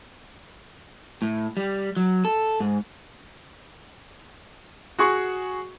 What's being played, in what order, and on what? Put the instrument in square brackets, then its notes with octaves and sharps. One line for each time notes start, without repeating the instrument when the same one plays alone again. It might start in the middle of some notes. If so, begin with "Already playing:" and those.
[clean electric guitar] A2
G3
F#3
A4
G#2
[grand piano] F#4 G#4 C#6